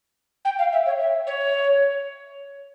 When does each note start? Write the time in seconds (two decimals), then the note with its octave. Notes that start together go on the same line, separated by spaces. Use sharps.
0.45 G5
0.59 F5
0.72 E5
0.86 C#5
0.99 E5
1.27 C#5